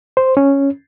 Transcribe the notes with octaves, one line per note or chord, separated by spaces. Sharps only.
C5
C#4